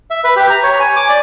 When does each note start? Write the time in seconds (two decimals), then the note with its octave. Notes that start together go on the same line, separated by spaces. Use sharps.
0.11 E5
0.24 B4
0.36 G4
0.50 A#5
0.63 C#5
0.80 G#5
0.96 D6
1.09 D5